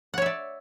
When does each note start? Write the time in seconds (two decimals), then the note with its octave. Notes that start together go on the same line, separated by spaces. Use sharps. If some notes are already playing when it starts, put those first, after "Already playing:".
0.14 F#5
0.18 C#5
0.22 E5
0.26 D5